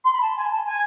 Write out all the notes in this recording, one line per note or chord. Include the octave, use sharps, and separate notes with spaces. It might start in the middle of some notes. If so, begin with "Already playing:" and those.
C6
B5
A5
G#5
A5
G#5